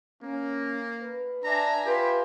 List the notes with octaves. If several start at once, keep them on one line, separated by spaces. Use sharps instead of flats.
A#3 C#4
B4
D4 E5 G#5 A#5
F4 G4 B4